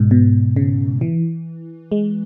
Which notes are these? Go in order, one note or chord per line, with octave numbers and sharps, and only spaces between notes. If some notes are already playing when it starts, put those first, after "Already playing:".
Already playing: G#2 B2
B2
C#3
E3
G#3